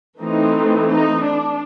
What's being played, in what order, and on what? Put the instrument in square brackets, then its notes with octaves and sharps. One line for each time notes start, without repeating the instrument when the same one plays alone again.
[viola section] E3 A3 C4 D#4
D#4
D4